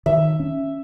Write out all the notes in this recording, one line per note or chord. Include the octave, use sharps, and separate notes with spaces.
D#3 E5
C#4